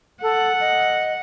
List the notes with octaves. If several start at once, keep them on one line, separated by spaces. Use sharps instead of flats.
A4 F#5
D#5